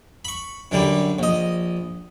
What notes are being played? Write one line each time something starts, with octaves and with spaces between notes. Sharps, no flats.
B5 C#6
F#2 D3 G3
A#1 D#5